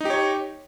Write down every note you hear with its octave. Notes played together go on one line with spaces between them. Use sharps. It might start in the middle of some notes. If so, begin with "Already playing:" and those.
D#4 G4 C#5